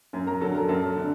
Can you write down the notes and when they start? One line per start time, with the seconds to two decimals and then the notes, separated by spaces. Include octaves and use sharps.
0.13 F#2
0.26 A#4 A#5
0.41 D3 F#3 A4 A5
0.55 A#4 A#5
0.68 F#2 A4 A5
0.96 D3